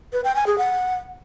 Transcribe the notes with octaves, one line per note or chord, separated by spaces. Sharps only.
B4
G5
G#5
G#4
F#5